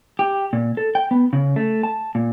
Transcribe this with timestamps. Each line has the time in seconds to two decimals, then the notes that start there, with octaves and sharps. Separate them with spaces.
0.19 G4
0.53 A#2
0.77 A4
0.95 G5
1.11 B3
1.33 C#3
1.56 A3
1.83 A5
2.15 A#2